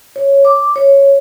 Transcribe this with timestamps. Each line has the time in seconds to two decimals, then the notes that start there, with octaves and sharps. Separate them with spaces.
0.16 C#5
0.45 D6
0.76 C#5